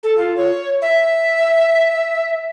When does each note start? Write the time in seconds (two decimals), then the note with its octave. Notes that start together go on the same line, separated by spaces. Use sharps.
0.03 A4
0.18 F4
0.37 C#5
0.82 E5